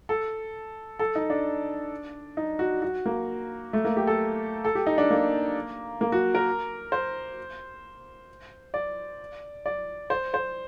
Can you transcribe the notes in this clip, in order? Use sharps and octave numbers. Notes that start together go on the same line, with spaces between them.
A4
A4
D#4
D4
D#4
F#4
F#4
A#3
A3
A#3
G4
A4
A4
G4
D#4
D4
A#3
A#3
F#4
A#4
C5
D5
D5
C5
C5